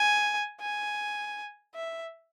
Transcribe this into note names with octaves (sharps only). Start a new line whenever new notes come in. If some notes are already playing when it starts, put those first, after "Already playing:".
Already playing: G#5
G#5
E5